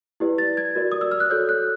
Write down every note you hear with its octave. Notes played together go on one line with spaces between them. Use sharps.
E4 G4 B4 D5
A6
G#6
F#4 A#4 D5
D#6
E6
F6
F#6
F#4 A4 C#5 G6
F#6